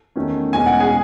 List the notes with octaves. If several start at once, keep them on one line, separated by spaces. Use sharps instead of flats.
E2 D#3 A3 C#4
E1 E2 B2 G#3 C#4 G#5
F#5
G#4 G#5